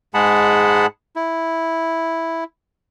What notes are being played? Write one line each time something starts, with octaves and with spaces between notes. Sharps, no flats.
G#2 G#3 G#4 F#5 A5 B5
E4